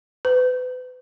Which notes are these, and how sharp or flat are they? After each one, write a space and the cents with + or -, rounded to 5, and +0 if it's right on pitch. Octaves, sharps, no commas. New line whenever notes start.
B4 +35